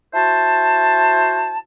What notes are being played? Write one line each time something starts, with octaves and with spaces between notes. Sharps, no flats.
E4 F#4 C5 A5